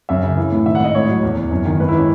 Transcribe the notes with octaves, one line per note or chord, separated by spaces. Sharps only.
F#2 E5
C#3
E3
A2
D#3 E5
F#5
G#2 D#5
A2 C#5
F#3
E2
E2
F#2
D#3
G#2 B4
E4
E3 C#4